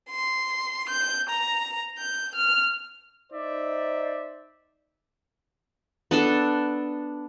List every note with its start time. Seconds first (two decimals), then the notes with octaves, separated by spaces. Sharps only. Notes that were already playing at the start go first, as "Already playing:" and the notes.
0.10 C6
0.89 G6
1.29 A#5
1.97 G6
2.34 F6
3.32 D#4 C5 D5 E5
6.11 B3 D4 A4